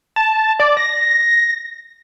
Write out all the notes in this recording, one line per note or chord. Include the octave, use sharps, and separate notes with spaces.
A5
D5
A#6